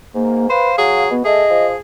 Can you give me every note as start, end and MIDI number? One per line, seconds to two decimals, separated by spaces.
0.14 0.45 44
0.14 0.49 58
0.49 0.70 71
0.49 0.75 72
0.49 1.03 77
0.78 1.06 54
0.78 1.13 68
1.10 1.22 47
1.10 1.22 59
1.25 1.43 57
1.25 1.80 68
1.25 1.66 75
1.50 1.74 53